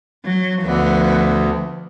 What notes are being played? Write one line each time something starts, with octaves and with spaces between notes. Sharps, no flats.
F#3
D2 F3 B3